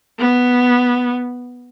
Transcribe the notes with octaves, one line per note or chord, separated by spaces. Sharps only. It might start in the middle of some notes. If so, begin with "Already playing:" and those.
B3